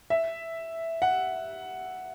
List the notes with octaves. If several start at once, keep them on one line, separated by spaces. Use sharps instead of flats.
E5
F#5